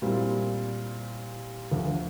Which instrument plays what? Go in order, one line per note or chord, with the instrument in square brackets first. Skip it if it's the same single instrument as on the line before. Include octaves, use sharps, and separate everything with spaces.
[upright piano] A#2 G3 C4 E4
D2 D3 F3